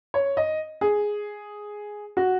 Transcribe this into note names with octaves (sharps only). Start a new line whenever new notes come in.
C#5
D#5
G#4
F#4